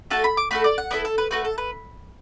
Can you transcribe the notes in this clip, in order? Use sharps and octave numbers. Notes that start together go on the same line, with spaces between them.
A3 F#4 A4 A5
B5
D6
A3 F#4 A4 B5
D5
F#5
B3 E4 A4 D5
A4
B4
A3 F#4 A4 B4
A4
B4